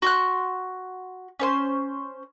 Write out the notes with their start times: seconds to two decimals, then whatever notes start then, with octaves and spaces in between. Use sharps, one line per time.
0.02 F#4 C6 F#6
1.39 C#4 C5 C6